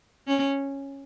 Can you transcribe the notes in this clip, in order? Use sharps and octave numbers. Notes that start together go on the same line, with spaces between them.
C#4